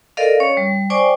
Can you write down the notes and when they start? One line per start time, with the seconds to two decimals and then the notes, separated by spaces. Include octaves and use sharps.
0.17 A4 A#4 D5 D#5 F5
0.40 C#4 C#5
0.57 G3
0.90 C5 D5 G5 G#5 C#6 D6